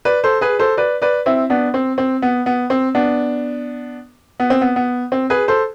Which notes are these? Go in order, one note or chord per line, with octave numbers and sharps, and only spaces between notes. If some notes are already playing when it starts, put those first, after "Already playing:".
B4 D5
A4 C5
G#4 B4
A4 C5
B4 D5
B4 D5
C4 E4
B3 D4
C4
C4
B3
B3
C4
B3 D4
B3
C4
B3
B3
C4
G#4 B4
A4 C5